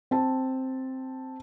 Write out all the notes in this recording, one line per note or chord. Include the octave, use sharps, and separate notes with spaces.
C4 A5